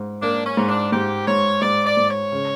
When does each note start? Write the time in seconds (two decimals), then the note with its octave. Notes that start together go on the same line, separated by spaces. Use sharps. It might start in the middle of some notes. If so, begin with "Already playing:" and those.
Already playing: G#2
0.22 A#3 D4
0.46 C#4
0.57 G#2
0.69 D4
0.92 G#2 G4
1.27 G#2 C#5
1.62 G#2 D5
1.85 D5
1.97 G#2
2.09 C#5
2.32 C#3